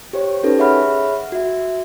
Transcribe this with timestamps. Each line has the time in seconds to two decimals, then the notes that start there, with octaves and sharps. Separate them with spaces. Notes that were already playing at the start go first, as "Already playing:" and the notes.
0.13 G4 C5 C#5
0.43 C#4 D#4 G4 A4 B4
0.59 G#4 C#5 E5 F#5 B5 F6
1.32 F#4 E5